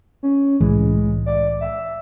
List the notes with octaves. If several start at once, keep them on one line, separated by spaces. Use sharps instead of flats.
C#4
C2 A2 E3 G#3
D5
E5